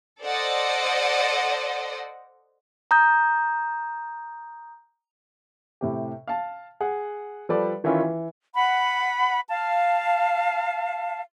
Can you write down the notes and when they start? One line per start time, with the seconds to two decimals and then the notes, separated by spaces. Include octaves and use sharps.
0.23 A4 C5 D5 D#5 F#5
2.91 A#5 D#6 G6
5.81 A2 C3 G4
6.28 F5 A5
6.80 G#4 F#5
7.49 F3 G3 A4 B4 D5
7.84 D#3 E3 C#4 E4 F4
8.01 E3
8.55 F#5 B5
9.49 F5 A5